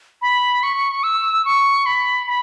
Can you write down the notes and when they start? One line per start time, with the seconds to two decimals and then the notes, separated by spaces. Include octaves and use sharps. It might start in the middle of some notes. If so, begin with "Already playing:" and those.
0.22 B5
0.63 C#6
1.03 E6
1.45 C#6
1.86 B5
2.27 B5